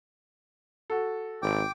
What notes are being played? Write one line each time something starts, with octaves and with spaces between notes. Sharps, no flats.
F#4 A4
G#1 G5 D6